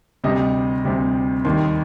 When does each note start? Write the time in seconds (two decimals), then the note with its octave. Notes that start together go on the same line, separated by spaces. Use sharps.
0.24 D2 C3 G3 D#5
0.84 D2 C3 G3
1.45 D#2 D#3 G3 C6